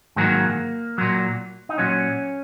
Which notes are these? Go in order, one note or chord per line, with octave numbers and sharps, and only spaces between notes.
G#2 D#3 F#3 A#3
A#2 F#3
D#4
A#2 F#3 C#4